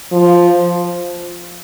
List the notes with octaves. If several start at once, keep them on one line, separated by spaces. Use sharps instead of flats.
F3